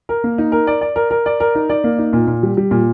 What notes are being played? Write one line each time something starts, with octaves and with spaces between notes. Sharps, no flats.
A#4
A#3
D#4
A#4
D5
D5
A#4
A#4
D5
A#4
D#4
D5
A#3
D#4
A#2
A#2
G3
G3
A#2